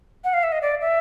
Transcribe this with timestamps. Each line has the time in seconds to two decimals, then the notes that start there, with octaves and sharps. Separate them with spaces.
0.24 F#5
0.34 F5
0.43 E5
0.52 D#5
0.62 D5
0.81 E5